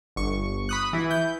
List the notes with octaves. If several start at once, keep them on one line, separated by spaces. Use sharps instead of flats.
G1 C#6
B5 D#6 F#6
E3 E4
G6